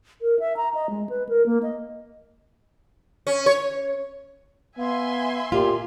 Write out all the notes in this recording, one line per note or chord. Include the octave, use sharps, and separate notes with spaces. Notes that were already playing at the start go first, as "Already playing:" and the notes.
A#4
E5
A#5
D#5
G#3
B4
A#4
A#3
D#5
C#4
C#5
B3 E5 F5 G#5 C6
A#2 F4 G4